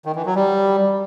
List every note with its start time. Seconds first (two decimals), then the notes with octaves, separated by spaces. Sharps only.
0.05 D#3
0.16 E3
0.26 F#3
0.36 G3